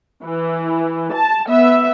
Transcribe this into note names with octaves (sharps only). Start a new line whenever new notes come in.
E3
A5
B3 E5